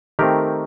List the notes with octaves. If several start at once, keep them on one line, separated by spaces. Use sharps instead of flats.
D#3 A3 C4 G4 A#4